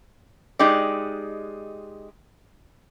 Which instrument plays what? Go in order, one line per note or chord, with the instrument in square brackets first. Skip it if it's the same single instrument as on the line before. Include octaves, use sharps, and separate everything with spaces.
[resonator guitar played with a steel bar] G#3 D#4 G4 D5